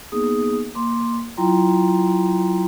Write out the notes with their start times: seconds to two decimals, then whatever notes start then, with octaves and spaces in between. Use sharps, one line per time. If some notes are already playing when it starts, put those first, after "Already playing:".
0.12 A#3 B3 D#4 G#4 D#6
0.75 A#3 C6 D6
1.37 F#3 E4 F4 G5 A#5 C6